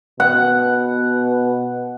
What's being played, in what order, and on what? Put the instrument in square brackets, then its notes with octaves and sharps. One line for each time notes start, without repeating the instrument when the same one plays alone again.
[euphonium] B2 [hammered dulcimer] F#5